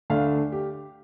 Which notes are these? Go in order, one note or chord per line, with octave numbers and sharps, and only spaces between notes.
D2 D3 A3 D4 F5
G4